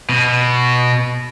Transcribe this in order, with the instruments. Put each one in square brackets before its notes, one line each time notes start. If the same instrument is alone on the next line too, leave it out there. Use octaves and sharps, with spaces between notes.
[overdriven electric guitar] B2